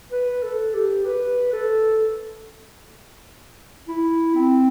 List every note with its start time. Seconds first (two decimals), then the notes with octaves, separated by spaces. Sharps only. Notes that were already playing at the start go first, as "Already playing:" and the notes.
0.12 B4
0.42 A4
0.74 G4
1.05 B4
1.52 A4
3.88 E4
4.35 C4